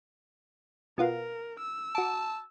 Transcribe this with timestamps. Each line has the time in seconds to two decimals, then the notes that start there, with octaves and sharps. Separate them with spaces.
0.98 B2 B3 F4 A#4
1.59 E6
1.95 F#4 A5 D6